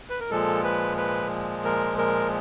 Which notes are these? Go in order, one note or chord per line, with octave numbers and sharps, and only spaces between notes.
B4
A#4
A#2 F3 G#3 A4
B4
B4
A#4
A#4